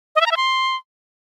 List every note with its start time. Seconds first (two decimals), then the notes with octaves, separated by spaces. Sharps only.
0.16 D#5
0.21 E5
0.26 A#5
0.31 E5
0.37 C6